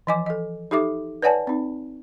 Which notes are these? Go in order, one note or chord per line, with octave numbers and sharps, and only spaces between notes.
E3 F3 D#5 G#5 D6
A4 D#5
D#4 G4 A4 E5 D6
B4 C#5 D5 F#5 G#5 A5
C4 D#4